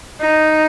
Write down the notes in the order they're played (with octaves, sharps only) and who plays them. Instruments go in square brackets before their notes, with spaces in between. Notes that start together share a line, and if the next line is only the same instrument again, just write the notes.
[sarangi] D#4